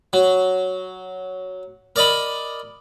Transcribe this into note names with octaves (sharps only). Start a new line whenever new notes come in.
F#3
A#4 D5 D#5 B5